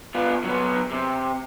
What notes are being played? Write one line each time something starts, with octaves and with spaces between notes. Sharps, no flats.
B3 F4
F#3 B3
C3